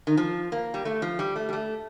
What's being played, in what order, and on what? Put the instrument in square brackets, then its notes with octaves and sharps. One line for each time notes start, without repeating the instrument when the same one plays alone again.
[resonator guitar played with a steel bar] D#3
F3
A#3
G3
A3
F3
G3
A3
G3
A3